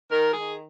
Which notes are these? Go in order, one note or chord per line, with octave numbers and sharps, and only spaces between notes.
D#3 A#4
D#3 G#4